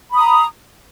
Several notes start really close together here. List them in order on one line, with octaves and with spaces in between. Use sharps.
B5 D#6 A#5